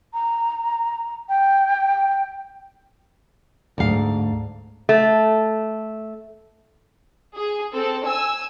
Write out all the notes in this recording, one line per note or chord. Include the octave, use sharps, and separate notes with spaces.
A#5
G5
D2 G#2 F5
A3
G#4
C4 A4
G#5 E6